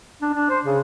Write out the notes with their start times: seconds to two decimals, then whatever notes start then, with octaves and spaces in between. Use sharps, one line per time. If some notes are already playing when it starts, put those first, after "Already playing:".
0.21 D4
0.34 D4
0.50 C5
0.64 C#3